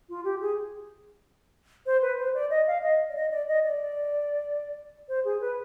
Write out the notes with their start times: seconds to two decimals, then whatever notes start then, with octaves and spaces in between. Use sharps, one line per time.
0.09 F4
0.24 G4
0.41 G#4
1.86 C5
2.02 B4
2.18 C5
2.34 D5
2.50 D#5
2.67 F5
2.83 D#5
3.09 D5
3.15 D#5
3.31 D5
3.48 D#5
3.64 D5
5.09 C5
5.25 G#4
5.41 B4